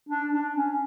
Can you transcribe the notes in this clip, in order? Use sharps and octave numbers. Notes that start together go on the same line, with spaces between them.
D4
D4
C#4